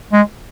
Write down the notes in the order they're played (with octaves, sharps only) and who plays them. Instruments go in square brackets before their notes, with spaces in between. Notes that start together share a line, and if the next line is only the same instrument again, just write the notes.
[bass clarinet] G#3